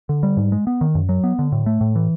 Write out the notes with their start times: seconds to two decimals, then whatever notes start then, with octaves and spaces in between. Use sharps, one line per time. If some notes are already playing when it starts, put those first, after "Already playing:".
0.09 D3
0.23 G3
0.37 G#2
0.52 G#3
0.67 B3
0.81 D#3
0.95 F#2
1.09 F#3
1.24 B3
1.39 D3
1.52 A2
1.66 A3
1.81 A2
1.96 E3